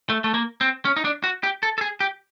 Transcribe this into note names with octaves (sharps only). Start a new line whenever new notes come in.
A3
A3
A#3
C4
C#4
D#4
D4
F#4
G4
A4
A4
G#4
G4